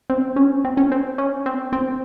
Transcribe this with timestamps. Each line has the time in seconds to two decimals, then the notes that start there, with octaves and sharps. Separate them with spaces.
0.10 C4
0.36 C#4
0.65 C4
0.77 C#4
0.92 C4
1.18 C#4
1.46 C4
1.73 C4